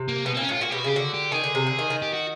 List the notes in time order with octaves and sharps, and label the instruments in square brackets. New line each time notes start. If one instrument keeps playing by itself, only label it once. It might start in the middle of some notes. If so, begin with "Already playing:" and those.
Already playing: [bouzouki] C3
[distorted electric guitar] A#3
[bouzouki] B2 [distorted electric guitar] B3
[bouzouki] A#2 [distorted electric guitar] C4
[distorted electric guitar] C#4
[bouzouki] A2 [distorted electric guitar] F4
[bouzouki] A#2 [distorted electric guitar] F#4
[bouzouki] B2 [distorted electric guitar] G4
[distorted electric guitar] F#4
[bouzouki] C#3 [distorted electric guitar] G4
[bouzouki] D3 [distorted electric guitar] F#4
[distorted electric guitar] G4
[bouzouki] D#3 [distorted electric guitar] G#4
[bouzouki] D3
C3
D3
D#3
D#3
[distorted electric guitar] G4
F#4